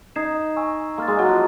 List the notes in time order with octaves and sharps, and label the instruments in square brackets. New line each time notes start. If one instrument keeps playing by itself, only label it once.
[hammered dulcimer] D#4 [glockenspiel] D#6 G#6 C7 E7
[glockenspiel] G#5 C#6 E6
[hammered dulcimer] A#3 [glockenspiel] C6 F6 A6
[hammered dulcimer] G#3
F#3
F3